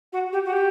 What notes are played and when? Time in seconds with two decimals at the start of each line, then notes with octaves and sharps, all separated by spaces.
0.12 F#4
0.32 G4
0.45 F#4
0.52 G4